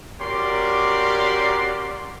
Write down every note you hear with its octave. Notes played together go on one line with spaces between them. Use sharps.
C#4 F#4 G4 A#4 D5 C6